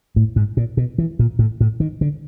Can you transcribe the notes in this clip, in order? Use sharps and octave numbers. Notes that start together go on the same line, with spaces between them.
A2
G#2
A#2
B2
E3
A#2
A2
A2
D#3
D3